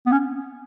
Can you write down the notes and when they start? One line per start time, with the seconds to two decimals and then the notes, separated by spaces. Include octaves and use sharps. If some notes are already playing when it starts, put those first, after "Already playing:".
0.06 B3
0.12 C#4